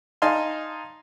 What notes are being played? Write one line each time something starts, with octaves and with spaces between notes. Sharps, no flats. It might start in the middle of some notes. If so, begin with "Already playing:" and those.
D#4 F5 G#5 A5 C6